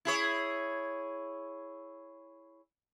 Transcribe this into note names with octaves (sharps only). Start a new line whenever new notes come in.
E4 G#4 C#5